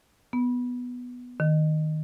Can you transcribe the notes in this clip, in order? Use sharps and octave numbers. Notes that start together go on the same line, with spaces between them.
B3
D#3